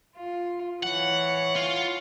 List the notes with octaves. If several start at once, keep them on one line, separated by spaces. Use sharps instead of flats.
F4
E3 C#5 F#5
F4